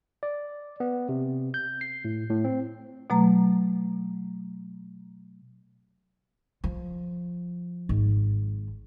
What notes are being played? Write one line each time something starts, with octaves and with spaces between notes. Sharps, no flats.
D5
B3
C3
G6
C7
A2
A2
C4
B2 F#3 A3 A#5
F3
G#1